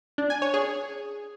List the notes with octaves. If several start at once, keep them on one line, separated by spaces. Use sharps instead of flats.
D4
G#5
C#5
G#4